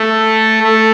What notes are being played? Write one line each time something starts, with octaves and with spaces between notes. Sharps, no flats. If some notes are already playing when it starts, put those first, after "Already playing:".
Already playing: A3
A3